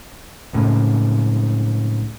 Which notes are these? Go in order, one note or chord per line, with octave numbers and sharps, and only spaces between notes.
C#2 A2 C#3